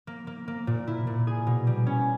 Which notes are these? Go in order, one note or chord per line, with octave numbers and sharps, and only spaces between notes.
A#3
A#3
A#3
A#2
E4
A#2
G#4
B2
G3
C#4